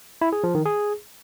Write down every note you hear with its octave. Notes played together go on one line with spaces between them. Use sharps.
E4
G#4
F3
D#3
G#4